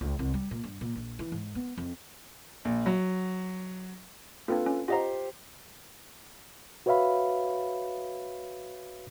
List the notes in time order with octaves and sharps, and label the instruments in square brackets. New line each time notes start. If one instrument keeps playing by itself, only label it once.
[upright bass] C#2
C2
G3
A#2
G2
A#2
A#1
E3
G#2
B3
F2
[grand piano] A#1
F#3
[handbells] A#3 C4 D4 [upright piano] F4 A4 B4
[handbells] C#4
[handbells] F4 D#5 A#5 [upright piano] G4 C5
[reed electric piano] F#4 B4 C#5 E5 F5 B5